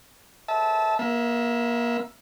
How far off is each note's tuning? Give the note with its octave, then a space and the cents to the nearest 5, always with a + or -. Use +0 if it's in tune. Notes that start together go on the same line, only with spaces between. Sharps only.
E5 -25 A5 -15
A#3 +30 E5 +0